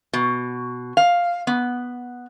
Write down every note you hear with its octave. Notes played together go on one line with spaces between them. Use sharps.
B2
F5
B3